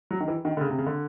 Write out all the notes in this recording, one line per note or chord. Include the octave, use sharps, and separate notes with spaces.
F#3
D#3
E3
D#3
D3
C#3
C3
C#3
D3